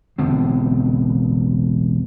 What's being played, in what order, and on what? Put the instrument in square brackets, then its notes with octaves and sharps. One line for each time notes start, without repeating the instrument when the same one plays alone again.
[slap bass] E1 A1 D3 C4